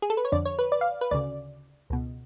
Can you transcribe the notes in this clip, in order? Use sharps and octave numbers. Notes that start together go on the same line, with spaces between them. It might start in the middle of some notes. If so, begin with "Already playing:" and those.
G#4
A4
B4
C#5
F2 D3 D5
C#5
B4
D5
F5
B4
D2 C#3 D5
C#2 B2